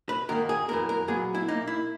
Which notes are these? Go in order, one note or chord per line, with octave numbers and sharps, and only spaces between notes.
B4
G#2 D#3 A#3 A#4
G#4
F#2 E3 B3 A#4
A#4
A#2 F#3 B3 G#4
E4
A#2 A#3 D#4
E4